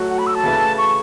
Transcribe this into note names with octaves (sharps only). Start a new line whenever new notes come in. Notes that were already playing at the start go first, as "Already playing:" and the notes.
Already playing: F#3 A3 F#4
F#5
B5
E6
A5
C#3 E3 A3 E4 B4
C#6